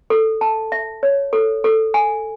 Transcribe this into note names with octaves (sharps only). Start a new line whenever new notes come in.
A4
A5
E5
C#5
A4
A4
G#5